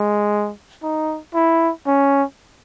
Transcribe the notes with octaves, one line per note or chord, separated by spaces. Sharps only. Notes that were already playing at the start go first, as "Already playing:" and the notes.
Already playing: G#3
D#4
E4
C#4